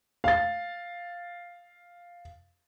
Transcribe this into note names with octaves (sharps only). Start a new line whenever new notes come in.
F5 A6